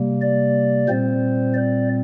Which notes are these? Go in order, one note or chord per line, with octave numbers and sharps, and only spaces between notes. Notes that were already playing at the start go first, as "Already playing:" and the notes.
Already playing: C3 G3 A#3
D5
A#2 G3 C4 C5
D5